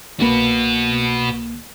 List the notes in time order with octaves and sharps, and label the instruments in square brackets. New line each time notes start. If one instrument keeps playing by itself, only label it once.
[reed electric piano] C2 A#3 [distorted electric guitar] F#4 B4